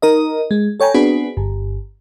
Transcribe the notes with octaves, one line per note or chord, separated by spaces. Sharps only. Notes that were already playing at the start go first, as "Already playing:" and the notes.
D#4 A#4 D#5
G#3
A4 C#5 G5 G#5 A#5
B3 C4 D4 F#4 G#4 B4
G1